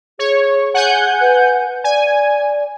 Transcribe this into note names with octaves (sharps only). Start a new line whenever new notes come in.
G#4 C#5
F#5 G#5 G6
B4
D5 G#5